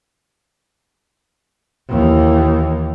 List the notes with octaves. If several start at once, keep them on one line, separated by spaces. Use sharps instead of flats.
D#2 E3